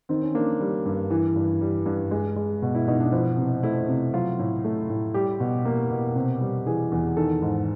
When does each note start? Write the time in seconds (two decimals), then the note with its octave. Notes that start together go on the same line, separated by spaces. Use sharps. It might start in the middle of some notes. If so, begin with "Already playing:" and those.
0.09 D#3 C4
0.23 C#4
0.35 A#3 D4
0.61 G3
0.85 G2
1.10 E3
1.36 G2
1.61 G3
1.86 G2
2.11 G#3
2.36 G#3
2.62 B2
2.75 E4
2.87 B2 D#4
3.00 D4
3.12 F3 E4
3.38 C3
3.63 A3 E4
3.89 C3
4.14 F#3 F4
4.39 A2
4.64 A3
4.90 A2
5.14 G3 G4
5.40 B2
5.65 A#3
5.91 B2
6.16 C3
6.41 G3
6.66 E3 G#4
6.92 E2
7.17 D#3 A4
7.42 G#2